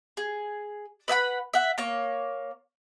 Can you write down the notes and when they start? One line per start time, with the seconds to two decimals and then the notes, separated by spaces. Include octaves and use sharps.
0.17 G#4
1.08 B4 E5 F#5 B5
1.54 E5 F#5
1.78 A#3 C#5